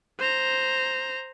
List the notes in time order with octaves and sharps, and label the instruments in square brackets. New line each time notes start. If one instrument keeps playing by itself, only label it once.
[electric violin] C5 A#5